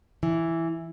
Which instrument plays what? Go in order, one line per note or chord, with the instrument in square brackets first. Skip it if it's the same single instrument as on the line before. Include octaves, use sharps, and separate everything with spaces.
[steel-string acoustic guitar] E3